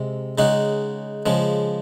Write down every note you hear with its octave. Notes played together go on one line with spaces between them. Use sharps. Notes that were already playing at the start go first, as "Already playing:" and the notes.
Already playing: C3 G#3
C#3 G#3 D#4 F#4
C#3 F3 G#3